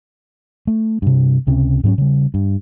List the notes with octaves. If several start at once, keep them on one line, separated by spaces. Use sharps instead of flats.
A3
G2 C3
C#2 C3 C#4
G#2 F#3 C4 C#4
C#3 G3
G2